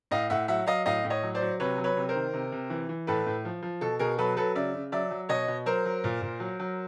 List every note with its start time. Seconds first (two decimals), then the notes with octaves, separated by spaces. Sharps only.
0.11 A2 D#5 F5
0.30 A2 E5 F#5
0.48 F#3 E5 F#5
0.67 F#3 D#5 F5
0.86 A2 D#5 F5
1.04 A2
1.10 C#5 D#5
1.23 F#3
1.35 C5 D5
1.41 F#3
1.60 C3 B4 C#5
1.78 F#3
1.84 B4 C#5
1.97 C3
2.09 A#4 C5
2.15 D#3
2.34 C3
2.52 C3
2.70 E3
2.89 E3
3.07 A2 A4 B4
3.26 A2
3.45 F3
3.62 F3
3.81 B2 A4
3.99 B2 G#4 A#4
4.18 F#3 A4 B4
4.36 F#3 A4 B4
4.55 C#3 D5 E5
4.74 C#3
4.92 F#3 D5 E5
5.11 F#3
5.29 B2 C#5 D#5
5.48 B2
5.66 F#3 A#4 C5
5.86 F#3
6.04 A#2
6.22 A#2
6.40 F#3
6.60 F#3